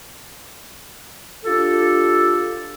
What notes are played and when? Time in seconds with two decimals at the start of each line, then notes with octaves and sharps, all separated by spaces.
1.45 D4 F4 G4 A4